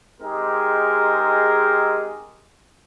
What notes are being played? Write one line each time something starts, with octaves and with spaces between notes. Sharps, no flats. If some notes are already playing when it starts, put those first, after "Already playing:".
G#3 C4 D#4 G4 G#4 A#4